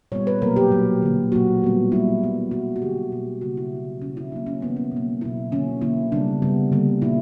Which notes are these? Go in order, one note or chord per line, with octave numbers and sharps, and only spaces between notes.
A#2 G3 B3 C#5
B4
B2 F#3 A#3 A#4
G4
A#2 F#3 A#3
D3 A#3
A#2 F#3 A#3 F#4
D3 G3 B3
A#2 G3 A#3 E4
A#2 F#3 B3
B2 A#3 F#4
F#4
D3 F#3 A#3 G4
B2 G3 A#3
C#3 G3 A#3 F#4
E4
D3 F#3 B3
C#3 E3 G3 C#4
E4
B2 F#3 A#3 D4
C#4
C#3 E3 G3 A#3 B3
C#4
B2 F#3 A#3
B2 F#3 B3 E4
D3 A#3 C#4
D3 A#3 E4
C#3 G3 B3 D4
C#3 G3 B3
D3 G3 A#3
A#2 A#3 E4